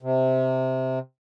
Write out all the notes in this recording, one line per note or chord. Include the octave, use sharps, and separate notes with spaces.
C3